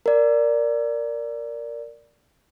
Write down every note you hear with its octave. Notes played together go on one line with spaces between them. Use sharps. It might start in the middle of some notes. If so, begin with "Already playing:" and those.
A#4 D5